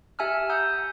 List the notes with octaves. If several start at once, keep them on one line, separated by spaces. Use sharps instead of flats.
G4 E5 G#5 A5 E6 F6
F#5 A#5 D#6 E6 G6